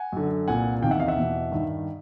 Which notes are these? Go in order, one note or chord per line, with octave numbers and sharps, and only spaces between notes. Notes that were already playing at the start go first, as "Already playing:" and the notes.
Already playing: F#5 G#5
F#2 D3
C2 A#2 F#5 G#5
E2 C3 D#3 F5 G5
E5 F#5
D#5 F5
E5 F#5
E2 B2
G2 D#3